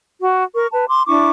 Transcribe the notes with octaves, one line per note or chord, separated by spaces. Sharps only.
F#4
A#4 C#6
B4 A5
C6 D6
D4 E4 C#6 D6